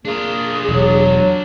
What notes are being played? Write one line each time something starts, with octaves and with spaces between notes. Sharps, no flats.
A#3 D4 F4 G#4
E1 F#3